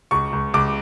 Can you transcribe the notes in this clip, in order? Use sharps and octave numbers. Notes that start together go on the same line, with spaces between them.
C#2 C#6
C#2
C#2 D6